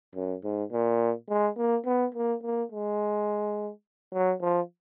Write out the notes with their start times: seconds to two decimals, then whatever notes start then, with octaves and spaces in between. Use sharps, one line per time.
0.15 F#2
0.44 G#2
0.72 A#2
1.29 G#3
1.57 A#3
1.86 B3
2.15 A#3
2.43 A#3
2.72 G#3
4.13 F#3
4.41 F3